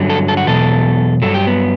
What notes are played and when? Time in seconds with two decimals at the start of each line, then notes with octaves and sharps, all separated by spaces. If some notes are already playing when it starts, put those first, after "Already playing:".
Already playing: G2 D3 F#3
0.10 A4
0.28 A4
0.37 F#4
0.47 E2 B2 F#3 A4
1.22 G2 F#3 A4
1.34 G4
1.47 B3